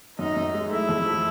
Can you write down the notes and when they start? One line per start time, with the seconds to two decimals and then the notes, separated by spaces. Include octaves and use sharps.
0.18 F#2 D#4
0.36 F#2
0.54 G#3
0.71 A3 E4
0.89 F2
1.06 F3